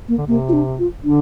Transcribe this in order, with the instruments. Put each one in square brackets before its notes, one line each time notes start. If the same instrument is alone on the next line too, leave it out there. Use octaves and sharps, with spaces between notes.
[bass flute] A#3
[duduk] D3
[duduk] C3 [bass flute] A#3
[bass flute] F4
D4
F4
[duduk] D3 [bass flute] D4